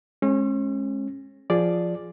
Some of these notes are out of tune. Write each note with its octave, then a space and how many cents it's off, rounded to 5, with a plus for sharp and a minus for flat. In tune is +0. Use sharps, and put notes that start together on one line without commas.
G#3 +20 C#4 -35
F3 +0 G#4 +0 D5 +0